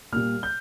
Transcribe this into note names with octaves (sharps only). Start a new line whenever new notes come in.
A#2 G3 A#3 F6
G6